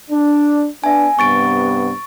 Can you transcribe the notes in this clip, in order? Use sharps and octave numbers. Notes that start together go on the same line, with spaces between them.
D4
B3 D4 E5 G#5
G2 C3 B3 C#6 A6 D7